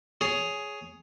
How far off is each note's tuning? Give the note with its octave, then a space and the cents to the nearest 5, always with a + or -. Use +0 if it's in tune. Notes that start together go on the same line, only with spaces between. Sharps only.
G#4 +5 C#5 +10